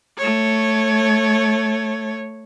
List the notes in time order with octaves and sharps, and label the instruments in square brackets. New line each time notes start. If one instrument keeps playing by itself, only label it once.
[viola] A3 C#5